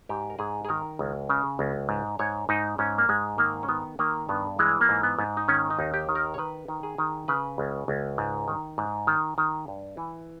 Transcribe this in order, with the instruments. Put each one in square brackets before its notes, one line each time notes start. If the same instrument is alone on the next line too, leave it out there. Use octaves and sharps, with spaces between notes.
[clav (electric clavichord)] G#2 G4
A#4
G#2 G#4
G#4
D#3 A#4
C#2
C#3
C#2
G#2
G#2 C#5
G#2 D#4
G#2 C#4
A#3
G#2 G#3
D#3 A#3
C#4
D#3 B3
D#3 A#3
G2 B3
E3 G#3
A#3
G#2
B3
G#2
D#4
D#3 C#4
D#4
D#2
G4
D#3
A#4
C#5
D#3 B4
D#3
G#4
D#3
C#3 B4
C#2
C#2
G#2
D#3
G#2
D#3
D#3
G2
E3